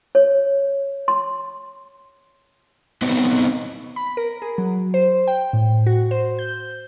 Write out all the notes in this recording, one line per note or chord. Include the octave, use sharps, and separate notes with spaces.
C#5
C6
B3 C4 D#4 D#5
B5
A#4
G#4
F#3
C5
G5
A2
F#4
C5
G6